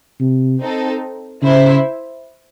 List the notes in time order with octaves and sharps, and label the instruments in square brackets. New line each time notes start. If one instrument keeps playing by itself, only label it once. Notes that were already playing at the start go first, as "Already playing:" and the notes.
[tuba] C3
[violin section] C4 D#4 A4
[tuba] C#3 [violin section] E4 C5 E5